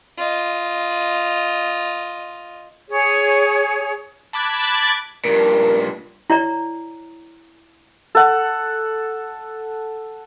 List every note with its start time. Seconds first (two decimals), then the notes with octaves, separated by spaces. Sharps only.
0.18 F4 D#5
2.89 G#4 C#5
4.33 A5 B5 D6 F#6 G#6 A6
5.25 G2 A#2 A#4
6.30 E4 C#5 D5 A#5
8.15 A4 F#5